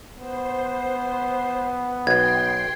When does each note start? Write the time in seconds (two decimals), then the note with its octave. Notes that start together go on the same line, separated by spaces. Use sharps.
0.18 B3 C5
2.07 B1 G5 C6 G#6